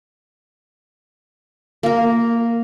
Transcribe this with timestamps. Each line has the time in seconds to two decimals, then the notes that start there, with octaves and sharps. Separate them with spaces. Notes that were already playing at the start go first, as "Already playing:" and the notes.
1.83 A#3 A#4